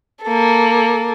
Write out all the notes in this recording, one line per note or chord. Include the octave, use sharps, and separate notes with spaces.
A#3 A4